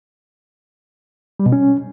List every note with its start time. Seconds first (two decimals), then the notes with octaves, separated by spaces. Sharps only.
1.40 G3
1.46 B2
1.52 C#4